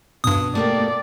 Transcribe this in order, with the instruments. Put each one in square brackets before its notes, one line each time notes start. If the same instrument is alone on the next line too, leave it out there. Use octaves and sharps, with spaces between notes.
[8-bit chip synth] G2 D#6 [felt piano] B2
[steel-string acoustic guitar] A3 A#3 G4 [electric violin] D5